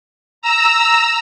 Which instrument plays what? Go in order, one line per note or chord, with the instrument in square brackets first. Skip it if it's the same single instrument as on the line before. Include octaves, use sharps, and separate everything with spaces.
[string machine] A#5 E6